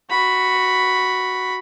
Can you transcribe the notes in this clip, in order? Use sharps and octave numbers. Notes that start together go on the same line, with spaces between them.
F#4 B5